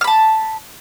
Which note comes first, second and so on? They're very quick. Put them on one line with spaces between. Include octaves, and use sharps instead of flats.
F6 B5 A5